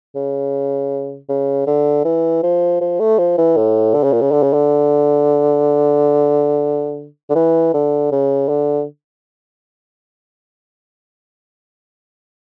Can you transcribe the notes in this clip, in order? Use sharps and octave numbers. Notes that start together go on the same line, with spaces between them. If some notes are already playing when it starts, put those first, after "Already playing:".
C#3
C#3
D3
E3
F3
F3
A3
F3
E3
A2
D3
C#3
A#2
C#3
D3
C#3
D3
D3
E3
D3
C#3
D3